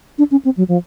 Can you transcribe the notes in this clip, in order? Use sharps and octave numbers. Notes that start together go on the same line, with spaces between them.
D4
C#4
C4
F#3
F3